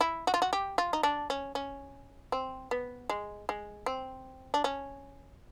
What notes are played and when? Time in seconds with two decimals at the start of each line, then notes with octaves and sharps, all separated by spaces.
0.01 E4
0.27 F#4
0.34 F4
0.42 F#4
0.53 G4
0.78 F4
0.93 D#4
1.03 D4
1.30 C#4
1.55 C#4
2.32 C4
2.71 B3
3.09 G#3
3.49 G#3
3.86 C4
4.54 D4
4.64 C#4